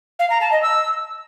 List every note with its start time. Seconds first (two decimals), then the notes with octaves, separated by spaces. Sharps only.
0.19 F5
0.30 A#5
0.41 A5
0.52 D#5
0.63 E6